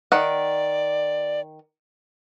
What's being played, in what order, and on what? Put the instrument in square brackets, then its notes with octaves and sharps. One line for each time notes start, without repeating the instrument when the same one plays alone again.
[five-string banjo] D#3 F#5 [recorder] D5